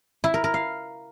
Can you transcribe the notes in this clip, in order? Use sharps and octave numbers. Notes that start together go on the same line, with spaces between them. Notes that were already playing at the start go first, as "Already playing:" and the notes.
E4
A#4
A#4
F5